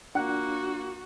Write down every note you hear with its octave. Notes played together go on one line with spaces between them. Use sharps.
A#3 D4 F4 F#4 F#5 F#6